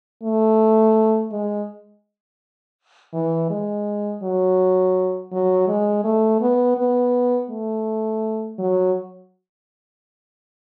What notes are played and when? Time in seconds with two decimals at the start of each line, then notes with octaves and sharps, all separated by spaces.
0.23 A3
1.32 G#3
3.13 E3
3.50 G#3
4.23 F#3
5.32 F#3
5.68 G#3
6.04 A3
6.41 B3
6.77 B3
7.50 A3
8.59 F#3